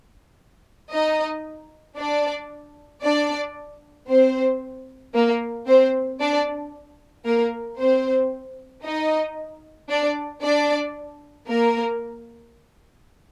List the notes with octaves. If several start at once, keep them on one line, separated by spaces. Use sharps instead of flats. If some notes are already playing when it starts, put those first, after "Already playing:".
D#4 D#5
D4 D5
D4 D5
C4 C5
A#3 A#4
C4 C5
D4 D5
A#3 A#4
C4 C5
D#4 D#5
D4 D5
D4 D5
A#3 A#4